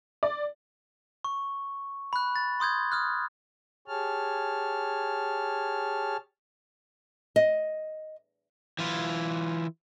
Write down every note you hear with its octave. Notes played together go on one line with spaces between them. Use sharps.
D5
C#6
B5 F#6
A6
C6 D#6 G6 G#6
D#6 F6 F#6
G4 G#4 C#5 A5 F6
D#5
E3 F4